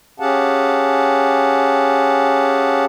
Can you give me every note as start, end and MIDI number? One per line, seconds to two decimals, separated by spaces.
0.20 2.85 61
0.20 2.85 67
0.20 2.85 68
0.20 2.85 77
0.20 2.85 78
0.20 2.85 81